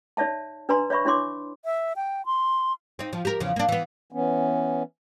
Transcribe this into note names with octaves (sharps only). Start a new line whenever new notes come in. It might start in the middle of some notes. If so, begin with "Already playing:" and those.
D#4 C#5 D5 E5 A5
D4 B4 D5 G#5 A#5 C6
C#5 D5 E5 B5 C#6
D4 E4 C#5 C6 D6
E5
G5
C6
C4 D#4
F3
G4 A#4
E2 C#3 F3
A#3 D4
E3 B3
E3 B3 C#4